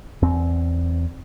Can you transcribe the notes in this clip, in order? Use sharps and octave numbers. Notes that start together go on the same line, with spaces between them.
E2 C4